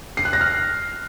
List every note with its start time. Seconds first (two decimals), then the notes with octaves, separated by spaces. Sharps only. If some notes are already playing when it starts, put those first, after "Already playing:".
0.17 C7
0.25 F#6
0.33 A#6
0.41 F6